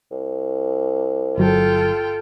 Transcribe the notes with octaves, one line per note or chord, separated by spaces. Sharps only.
C2
G1 F#3 F4 A4 G5